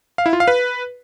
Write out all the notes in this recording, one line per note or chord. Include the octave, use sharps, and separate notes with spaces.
F5
E4
F4
F5
B4